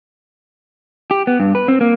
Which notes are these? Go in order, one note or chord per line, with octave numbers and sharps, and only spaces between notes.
G4
B3
G2
B4
C4
A#3